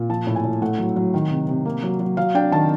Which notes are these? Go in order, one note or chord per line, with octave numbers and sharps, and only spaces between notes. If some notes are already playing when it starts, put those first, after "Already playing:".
Already playing: A#2
F3 A5
A2
G#5
A2
A3 F#5
F#3
F#3
D#3
C3
C3
A#3
F#3
F#3
F#3 F5
D4 G5
D#3 A5